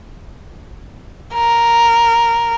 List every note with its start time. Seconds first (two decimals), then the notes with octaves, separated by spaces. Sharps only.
1.34 A#4